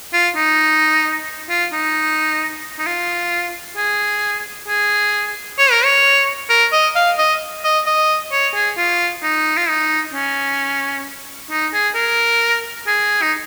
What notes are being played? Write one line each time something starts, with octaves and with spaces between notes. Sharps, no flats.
F4
D#4
F4
D#4
D#4
F4
G#4
G#4
C#5
A#4
C#5
A#4
D#5
F5
D#5
D#5
D#5
C#5
G#4
F4
D#4
F4
D#4
C#4
D#4
G#4
A#4
G#4
D#4